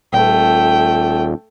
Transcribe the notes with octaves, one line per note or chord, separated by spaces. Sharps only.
D#1 A3 G5